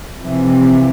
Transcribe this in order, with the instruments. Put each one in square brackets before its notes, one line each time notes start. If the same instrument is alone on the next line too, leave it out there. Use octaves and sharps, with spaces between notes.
[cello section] C3 E3 F3